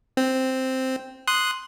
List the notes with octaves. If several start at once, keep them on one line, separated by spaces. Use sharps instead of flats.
C4
C6 D#6 F#6